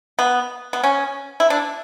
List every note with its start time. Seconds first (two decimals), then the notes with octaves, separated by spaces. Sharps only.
0.19 B3
0.73 B3
0.83 C#4
1.40 E4
1.50 D4